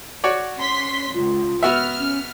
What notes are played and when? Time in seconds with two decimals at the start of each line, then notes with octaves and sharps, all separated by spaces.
0.24 F#4 C#5 D5
0.58 C#4 C6 B6
1.14 C#2 F4
1.63 B3 F#4 E5 F6
1.99 C#4